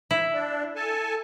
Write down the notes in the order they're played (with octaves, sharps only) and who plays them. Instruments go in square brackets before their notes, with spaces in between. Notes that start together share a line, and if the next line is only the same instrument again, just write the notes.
[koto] E4
[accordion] D4
A4 G#5 A5